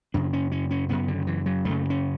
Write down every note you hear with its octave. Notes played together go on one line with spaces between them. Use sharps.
F#2 C#3 D4
C#4
C#4
C#4
F#2 C#3 B3
D3
E3
F#3
F#2 C#3 A3
C#4